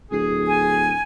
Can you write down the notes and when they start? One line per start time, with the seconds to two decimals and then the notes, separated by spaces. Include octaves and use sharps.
0.11 D1 G#4
0.47 G#5